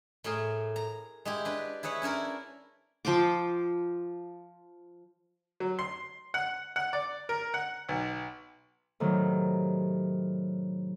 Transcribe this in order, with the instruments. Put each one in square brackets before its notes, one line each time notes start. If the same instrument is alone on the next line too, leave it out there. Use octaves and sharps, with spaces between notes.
[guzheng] A2 A3 G#4 A#4
A#5
G#3 E4 G4
D4 B4
E4 G#4 B4 C#5
C#4 D4 E4 A#4
[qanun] F3 G5 C6 D6
[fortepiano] F#3
C6
F#5
F#5
D5
A#4
F#5
B1
[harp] A2 C3 D#3 F#3 G4